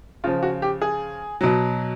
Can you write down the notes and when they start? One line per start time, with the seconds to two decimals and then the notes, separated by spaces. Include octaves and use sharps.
0.24 C#3 F3 F4
0.43 F#4
0.62 G4
0.82 G#4
1.41 B2 F#3